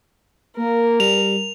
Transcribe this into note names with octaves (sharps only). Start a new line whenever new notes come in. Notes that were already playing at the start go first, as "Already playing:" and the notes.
A#3 A#4
G3 F7